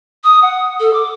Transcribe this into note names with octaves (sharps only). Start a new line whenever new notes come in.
D#6
F#5
A4
D6